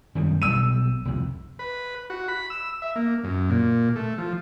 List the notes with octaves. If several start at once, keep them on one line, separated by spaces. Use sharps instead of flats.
F#2 D#3 G3
B1 G3 E6 D#7
C2 F2
B4
F#4
B5
E6
E5
A#3
F#2
A#2
A3
F3